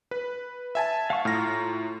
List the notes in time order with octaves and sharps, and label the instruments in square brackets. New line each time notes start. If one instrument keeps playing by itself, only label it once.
[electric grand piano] B4
E5 G#5 A5
[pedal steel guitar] F5 F#5 C#6
[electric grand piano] A2 A#6 [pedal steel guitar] F4 A#5 F6